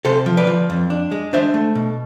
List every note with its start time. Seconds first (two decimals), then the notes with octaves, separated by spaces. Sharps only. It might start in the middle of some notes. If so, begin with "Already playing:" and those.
0.05 C3 A4 C5
0.26 F3
0.37 B4 D5
0.47 F3
0.70 F2
0.90 D4
1.11 G#3
1.33 D4 C5 E5
1.54 A3
1.75 B2